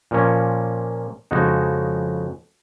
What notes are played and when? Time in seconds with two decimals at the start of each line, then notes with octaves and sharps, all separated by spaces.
0.11 A#2 F3 A#3 C#4
1.31 F2 C#3 G#3 D#4 F#4